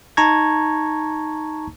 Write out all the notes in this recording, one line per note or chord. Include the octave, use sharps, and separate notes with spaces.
D#4 A5 A#5 C#6 G#6